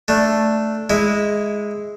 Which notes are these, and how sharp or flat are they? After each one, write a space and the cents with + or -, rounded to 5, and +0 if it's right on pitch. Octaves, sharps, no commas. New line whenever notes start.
A3 +0 D4 +0
G#3 +0 E4 -10